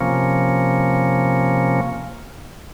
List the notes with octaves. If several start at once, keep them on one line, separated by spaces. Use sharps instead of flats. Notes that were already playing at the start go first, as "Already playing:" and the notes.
C3 F3 A#3 C#4